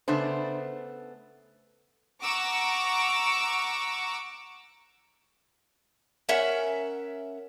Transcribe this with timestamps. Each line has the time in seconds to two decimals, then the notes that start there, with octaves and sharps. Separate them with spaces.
0.08 C#3 A3 B3 D4 C5
2.22 F#5 A#5 C#6 D6 E6
6.29 C#4 A#4 E5 F#5